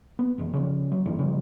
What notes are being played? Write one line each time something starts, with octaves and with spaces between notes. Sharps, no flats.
B3
G1 F#2 E3
C#3 F3 C#4
F#3
G2 D#3 E3
C#3 F3 G3